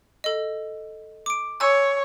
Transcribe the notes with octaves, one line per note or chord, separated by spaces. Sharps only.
A4 D#5
D6 D7
C#5 G#5 E6